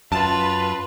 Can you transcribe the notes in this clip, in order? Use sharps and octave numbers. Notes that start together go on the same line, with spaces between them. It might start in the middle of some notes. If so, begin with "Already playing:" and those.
F#2 F4 B4 A5